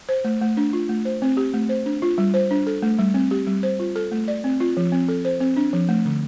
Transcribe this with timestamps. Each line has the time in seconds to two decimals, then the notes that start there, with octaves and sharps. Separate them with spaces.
0.09 C5
0.24 A3
0.41 A3
0.57 D4
0.73 F4
0.89 A3
1.05 C5
1.22 C4
1.37 G4
1.54 A3
1.69 C5
1.86 D4
2.02 F4
2.18 G3
2.34 C5
2.51 D4
2.67 A4
2.82 A3
2.99 G3
3.14 C4
3.31 G4
3.47 G3
3.63 C5
3.79 F4
3.96 A4
4.11 A3
4.28 D5
4.44 C4
4.60 F4
4.77 F3
4.92 C4
5.08 A4
5.25 C5
5.40 C4
5.57 D4
5.73 F3
5.89 A3
6.05 D3